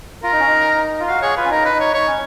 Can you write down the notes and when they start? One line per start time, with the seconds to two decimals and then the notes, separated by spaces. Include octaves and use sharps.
0.23 F4 A#4
0.32 D#4
0.40 C#4
0.48 D#4
1.00 F4
1.08 F#4 F5
1.22 G#4 C#5
1.37 F4 B4
1.45 C#4
1.50 D#4 A#4
1.65 B4
1.73 D#4
1.80 C#5
1.94 D#4 C#5
2.07 C#4